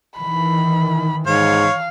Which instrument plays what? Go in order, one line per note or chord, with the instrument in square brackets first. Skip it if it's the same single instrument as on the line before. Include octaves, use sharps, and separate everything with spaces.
[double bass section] D#3 E3 [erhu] B5
[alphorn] G#2 [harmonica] C#5 [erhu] F5